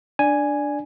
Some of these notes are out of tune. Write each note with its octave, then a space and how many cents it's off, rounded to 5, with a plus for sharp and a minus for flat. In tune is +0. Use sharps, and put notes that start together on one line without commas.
D4 +0 D5 +0 G#5 +0